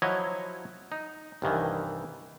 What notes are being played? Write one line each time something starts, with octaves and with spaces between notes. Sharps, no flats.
F3 F#3 E4 C#5 D#5
D#4
C2 G2 D#3 E3